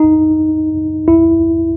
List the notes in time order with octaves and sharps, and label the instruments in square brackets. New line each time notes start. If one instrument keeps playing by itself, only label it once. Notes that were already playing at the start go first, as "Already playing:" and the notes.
Already playing: [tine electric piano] D#4
E4